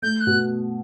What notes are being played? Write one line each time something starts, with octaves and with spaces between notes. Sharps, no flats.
A3 G6
F#6
B2